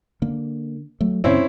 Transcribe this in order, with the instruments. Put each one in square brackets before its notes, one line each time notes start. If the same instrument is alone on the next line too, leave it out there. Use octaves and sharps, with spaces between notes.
[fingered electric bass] D3 A#3
F#3 A3
[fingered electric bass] F#2 A#2 C#3 [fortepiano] C4 C#4 E4